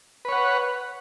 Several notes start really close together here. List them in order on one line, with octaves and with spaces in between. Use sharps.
B4 C#5 F#5